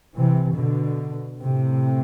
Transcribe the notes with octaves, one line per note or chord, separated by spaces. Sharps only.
C3 E3
B2 D3
A2 C3